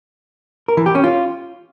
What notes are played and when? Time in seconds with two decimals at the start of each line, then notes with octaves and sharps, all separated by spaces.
0.68 A#4
0.77 E3
0.86 G4
0.95 C#4
1.04 F4